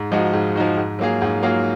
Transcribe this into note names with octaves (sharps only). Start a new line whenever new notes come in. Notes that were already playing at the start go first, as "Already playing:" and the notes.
Already playing: G#2
F3 G#3 D#4 F#4
G#2
F3 G#3 D#4 F#4
G#2
F#3 A#3 F4 G#4
G#2
F#3 A#3 F4 G#4